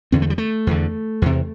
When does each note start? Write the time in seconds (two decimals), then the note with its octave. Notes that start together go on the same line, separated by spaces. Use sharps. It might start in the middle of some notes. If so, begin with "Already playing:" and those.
0.12 E2 D3 C4
0.22 A3
0.30 G3
0.38 A3
0.67 E2 D3
1.22 E2 C3